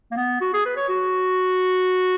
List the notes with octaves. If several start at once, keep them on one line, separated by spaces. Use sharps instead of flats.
A#3
B3
F#4
G#4
B4
C#5
F#4